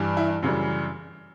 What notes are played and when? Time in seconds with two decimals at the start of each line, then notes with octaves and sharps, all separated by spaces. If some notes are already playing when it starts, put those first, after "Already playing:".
Already playing: G2 E3 G3
0.17 E4
0.43 F#2 C#3 E3 G3